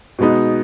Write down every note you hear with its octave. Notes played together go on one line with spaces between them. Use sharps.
B2 G#3 B3 D#4